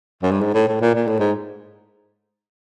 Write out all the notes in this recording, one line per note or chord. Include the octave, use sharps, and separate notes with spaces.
F#2
G2
G#2
A2
A2
A#2
A#2
A2
G#2